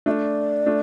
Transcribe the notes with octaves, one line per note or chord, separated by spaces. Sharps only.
A3 D4 E5
D5
A3 D4